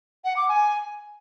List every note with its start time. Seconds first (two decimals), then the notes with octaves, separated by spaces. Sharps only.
0.25 F#5
0.37 D6
0.49 G#5